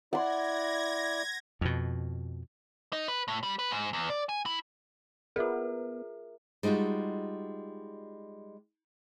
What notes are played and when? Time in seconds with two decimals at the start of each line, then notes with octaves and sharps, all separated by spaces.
0.13 E4 D5 F#5 C6 G#6 A#6
1.61 F2 B2
2.93 D#4
3.08 B4
3.28 A2
3.43 G3
3.59 B4
3.71 G#2
3.93 E2
4.10 D5
4.29 G#5
4.46 E4
5.36 B3 F4 G#4 A#4 E5
6.63 G3 G#3 D#4 F4 F#4